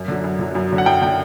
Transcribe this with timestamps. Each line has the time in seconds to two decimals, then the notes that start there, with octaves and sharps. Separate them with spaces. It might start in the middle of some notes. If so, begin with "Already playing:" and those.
Already playing: F#2
0.08 D3 F#3
0.24 F#2
0.39 D3 F#3
0.55 F#2
0.71 D3 F#3
0.78 F#5
0.86 F#2 G5
1.02 D3 G5
1.05 F#3